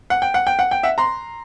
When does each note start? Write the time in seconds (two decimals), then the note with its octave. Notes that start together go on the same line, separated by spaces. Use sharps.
0.10 F#5
0.22 G5
0.34 F#5
0.47 G5
0.59 F#5
0.71 G5
0.83 E5 F#5
0.98 A#5 C6